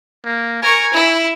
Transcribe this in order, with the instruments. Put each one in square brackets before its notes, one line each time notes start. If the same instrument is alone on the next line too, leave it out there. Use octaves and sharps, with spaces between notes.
[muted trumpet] A#3
[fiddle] A#4 C#6 [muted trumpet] G#5
[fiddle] E4